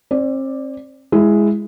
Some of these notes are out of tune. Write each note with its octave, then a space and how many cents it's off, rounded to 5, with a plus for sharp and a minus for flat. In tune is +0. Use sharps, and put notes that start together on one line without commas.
C4 +40 D5 +0
G#3 +0 E4 +10